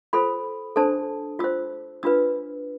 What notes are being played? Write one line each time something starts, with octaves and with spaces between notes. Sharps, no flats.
F4 A4 C5 B5
D4 A4 C5 A5
F4 C5 E6
D4 F4 B4 E6